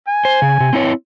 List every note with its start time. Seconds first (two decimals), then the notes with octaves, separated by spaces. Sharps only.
0.08 G#5
0.25 C5
0.42 C#3
0.60 C3
0.73 C4 E4 C#5